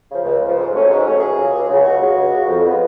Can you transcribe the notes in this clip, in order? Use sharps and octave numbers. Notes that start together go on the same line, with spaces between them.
C#3 F3
C#2
C#3 F3
G#2
F#3 A3 C#4
G#2
F#3 A3 C#4
C#2 G#4
C#3 F#3
C#2
C#3 F#3
C#2 F#4
C#3 G#3
C#2
C#3 G#3
F2
F3 G#3 B3